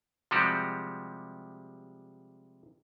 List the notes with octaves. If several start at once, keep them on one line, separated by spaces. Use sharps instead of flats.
C3 F3 G3 G#3 F#4 G4